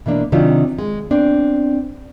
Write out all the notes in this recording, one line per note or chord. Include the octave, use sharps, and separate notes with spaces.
B2 E3 A#3 D4
C3 D#3 F#3 C#4 D4 F4
G#3
B3 C4 D4